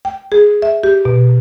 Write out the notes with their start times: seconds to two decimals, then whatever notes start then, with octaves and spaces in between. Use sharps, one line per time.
0.05 G5
0.32 G#4
0.62 E5
0.83 G4
1.05 B2